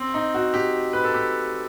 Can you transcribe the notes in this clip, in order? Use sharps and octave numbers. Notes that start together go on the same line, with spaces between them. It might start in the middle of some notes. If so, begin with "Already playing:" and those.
Already playing: C4
D#4
F#4
G4
B4
A4
G4